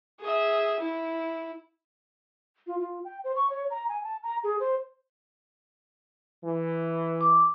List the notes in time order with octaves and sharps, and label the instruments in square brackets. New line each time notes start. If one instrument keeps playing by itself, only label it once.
[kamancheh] G#4 E5
E4
[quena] F4
F4
G5
C5
C#6
C#5
A#5
G#5
A5
A#5
G#4
C5
[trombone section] E3
[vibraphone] D6